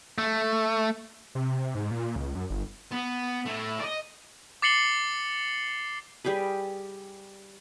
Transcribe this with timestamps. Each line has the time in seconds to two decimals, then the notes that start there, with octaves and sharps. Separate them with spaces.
0.18 A3
1.35 C3
1.75 G#2
1.91 A#2
2.16 C#2
2.35 F#2
2.50 G1
2.92 B3
3.46 A3 E4
3.81 D5 D#5
4.62 D6 A6 C7 C#7 F#7 G7
6.25 G3 G4 G#4 B4